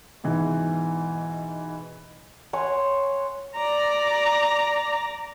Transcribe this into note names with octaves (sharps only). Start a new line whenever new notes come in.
G#2 B2 E3
C#5 F#5 G#5 C6
D5 A#5